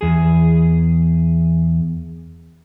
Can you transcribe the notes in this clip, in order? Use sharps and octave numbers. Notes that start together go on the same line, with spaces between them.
E2 G#4